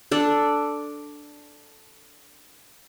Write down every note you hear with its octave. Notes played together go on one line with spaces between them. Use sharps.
D4 A4